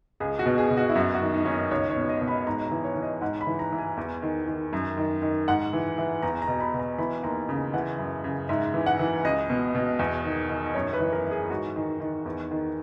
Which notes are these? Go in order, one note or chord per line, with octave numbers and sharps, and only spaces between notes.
C#2 G#4
F#4
B2
G#4
B2
F#4
E4
F#2 F#4
F#4
D#3
D#4
D#3 C#4
D#4
C#2 C#5
C#5
B2
D#5
B2
B5
G#2 A#5
A#5
E3
C#5
E3
D#5
G#2 F#5
B5
E3
A#5
E3
G#5
E2
D#3
D#3
F#2
D#3
D#3
G#2 F#5
E3
E3
E2 A#5
A#5
B2
B5
B2
A#5
E3 B5
D#2 A#5
C#3
E3 F#5
F#2
C#3
G#2 E5
E3
F#5
E3
C#2 D#5
B2
B2
E2
D#3
D#3
F#2 C#5
B4
E3
A#4
E3
G#4
G#2 F#4
D#3
D#3
E2
D#3